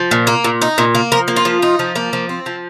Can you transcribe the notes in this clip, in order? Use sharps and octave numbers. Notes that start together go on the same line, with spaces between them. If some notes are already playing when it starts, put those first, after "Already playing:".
Already playing: F3
A#2
A#3
A#2
D#4
A#2
A#3
F3 A#4
A#3
F4
F3
D#4
F3
A#3
F3
C4
F3